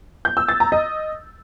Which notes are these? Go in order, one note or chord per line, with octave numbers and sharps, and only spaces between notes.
G6
E6
A6
A#5
D#5